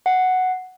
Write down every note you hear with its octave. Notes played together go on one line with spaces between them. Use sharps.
F#5